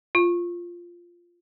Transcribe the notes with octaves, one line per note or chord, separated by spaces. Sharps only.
F4